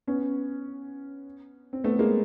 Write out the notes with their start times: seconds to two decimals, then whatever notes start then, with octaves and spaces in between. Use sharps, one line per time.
0.07 B3 C#4
1.73 C4
1.84 A3 B3
1.99 G#3 A#3